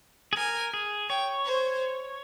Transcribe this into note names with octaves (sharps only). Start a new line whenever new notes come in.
G#4
A#4 G#5
G#4
C#5 G5
C5